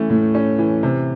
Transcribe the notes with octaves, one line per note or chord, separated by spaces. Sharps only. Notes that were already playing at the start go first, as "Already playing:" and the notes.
Already playing: E3 A3 C#4
A2
C#4
E3
C3